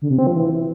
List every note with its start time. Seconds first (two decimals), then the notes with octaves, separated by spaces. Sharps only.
0.02 D3
0.10 C3
0.19 C4
0.27 F3
0.35 E3